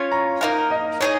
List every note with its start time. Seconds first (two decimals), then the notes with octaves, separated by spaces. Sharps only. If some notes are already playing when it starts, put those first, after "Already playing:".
Already playing: C#4 F4 C#5 G#5
0.12 A#5
0.41 A#3 D#4 A#4 F5
0.71 D#5
1.00 D#4 G#4 C#5 D#5